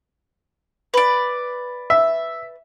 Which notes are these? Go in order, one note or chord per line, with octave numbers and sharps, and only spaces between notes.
B4 D5
E5